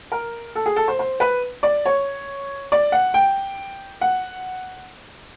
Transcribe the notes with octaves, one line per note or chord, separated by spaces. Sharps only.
A#4
A4
G#4
A4
C5
C5
B4
D5
C#5
D5
F#5
G5
F#5